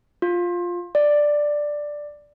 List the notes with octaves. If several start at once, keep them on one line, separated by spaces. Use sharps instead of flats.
F4
D5